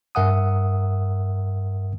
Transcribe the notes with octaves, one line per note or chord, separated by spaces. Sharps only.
G2 A#4 E5 F#5 G#5 D#6